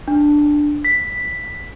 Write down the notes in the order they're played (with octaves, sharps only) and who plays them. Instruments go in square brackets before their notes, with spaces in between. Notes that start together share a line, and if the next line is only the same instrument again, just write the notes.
[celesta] D4
B6